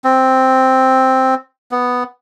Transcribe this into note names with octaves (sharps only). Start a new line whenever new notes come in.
C4
B3